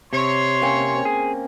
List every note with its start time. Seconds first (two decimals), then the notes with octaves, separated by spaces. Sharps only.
0.13 C3 C#5 C6
0.62 A#3 C4 C#4
1.05 G#4